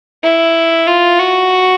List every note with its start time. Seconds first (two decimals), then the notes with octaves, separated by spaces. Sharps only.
0.24 E4
0.87 F4
1.19 F#4